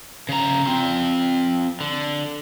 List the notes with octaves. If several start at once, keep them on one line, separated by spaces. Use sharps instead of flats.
C#3 A#5
C4 F4
D3